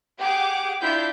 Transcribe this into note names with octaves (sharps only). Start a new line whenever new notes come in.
G4 G#4 F#5 D6
D4 E4 F4 G6 B6